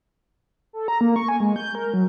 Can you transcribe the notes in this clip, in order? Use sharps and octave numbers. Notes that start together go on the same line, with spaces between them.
A4
A#5
A#3
C#6
G#5
G#3
G6
A#4
F#3